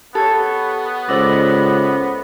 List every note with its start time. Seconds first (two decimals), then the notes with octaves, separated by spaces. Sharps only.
0.15 B3 G4 A4 C#5
1.09 C#2 A4 C5 D5 E5 A#6